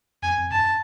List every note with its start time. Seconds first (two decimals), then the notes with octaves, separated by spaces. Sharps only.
0.22 F2 G#5
0.37 F2
0.52 G2 A5